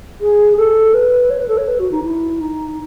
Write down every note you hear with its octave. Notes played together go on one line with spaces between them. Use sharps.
G#4
A4
B4
C#5
B4
A4
C#5
B4
F#4
D#4
E4
D#4